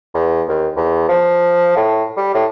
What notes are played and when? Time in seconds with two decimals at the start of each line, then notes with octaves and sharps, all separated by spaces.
0.14 E2
0.48 D#2
0.76 E2
1.08 F3
1.76 A2
2.17 G3
2.34 A2